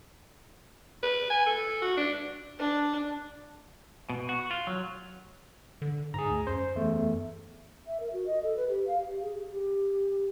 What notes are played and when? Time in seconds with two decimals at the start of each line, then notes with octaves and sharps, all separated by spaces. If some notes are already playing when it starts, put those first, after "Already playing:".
1.03 B4
1.30 G#5
1.46 A4
1.82 F#4
1.97 D4
2.59 D4
4.10 B2
4.29 F#4
4.51 F4
4.67 F#3
5.82 D3
6.14 G#2 G#4 A#5
6.31 D2
6.47 F#2 C5
6.75 E2 A3
7.87 E5
8.00 A#4
8.13 F#4
8.26 D#5
8.43 A4
8.56 B4
8.69 G4
8.87 F5
9.02 G4
9.22 G#4
9.51 G4